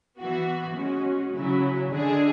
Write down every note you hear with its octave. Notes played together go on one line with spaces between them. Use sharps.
E3 B3 F#4
G#3 C#4 F#4
C#3 F#3 C#4 E4
D3 G#3 D4 G#4